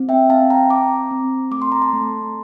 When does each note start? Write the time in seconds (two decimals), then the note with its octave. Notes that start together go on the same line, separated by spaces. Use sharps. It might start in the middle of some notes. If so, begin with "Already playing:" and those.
Already playing: C4
0.09 E5 G5
0.29 C4 F5 A5
0.50 G5 A#5
0.70 C4 A#5 D6
1.11 C4
1.51 A3 D6
1.62 C6
1.72 A#5
1.82 A5 C6
1.93 A3